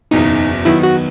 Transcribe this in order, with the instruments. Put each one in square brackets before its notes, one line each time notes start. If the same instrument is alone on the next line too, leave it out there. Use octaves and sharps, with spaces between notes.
[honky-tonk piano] F#1 E2 B2 [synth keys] D#4
[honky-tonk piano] D#3 F#3 B3 [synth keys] E4
[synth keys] F#4